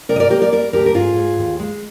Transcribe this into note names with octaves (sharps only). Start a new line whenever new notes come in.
C3 A#4 D5
D#5
A#4 D5
A#3 G4 A#4
A#4 D5
G3 A#4 D5
D2 G4 A#4
A#4
G#2 F4 G#4
G#2
D#2
G#3